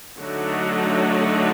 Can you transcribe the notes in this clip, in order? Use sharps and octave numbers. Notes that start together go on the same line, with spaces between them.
D3 F#3 A3 D#4 F#4